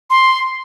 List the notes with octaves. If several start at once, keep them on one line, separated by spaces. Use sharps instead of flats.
C6